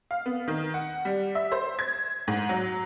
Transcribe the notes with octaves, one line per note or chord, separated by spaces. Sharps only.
F5
B3
D#3
F#5
G3
E5
C5
G#6
G#2
F#3